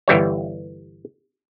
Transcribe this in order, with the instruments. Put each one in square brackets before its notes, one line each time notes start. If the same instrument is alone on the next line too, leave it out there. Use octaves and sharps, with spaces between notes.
[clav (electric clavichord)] G1 E3 G3 C#5